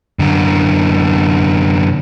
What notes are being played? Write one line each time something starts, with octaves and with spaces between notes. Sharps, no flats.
F#2 D3